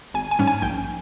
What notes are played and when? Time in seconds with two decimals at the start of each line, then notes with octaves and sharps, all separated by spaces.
0.14 G#1 G#5
0.31 G#5
0.39 G#2 G3 C#4
0.47 G#5
0.62 A#1 G5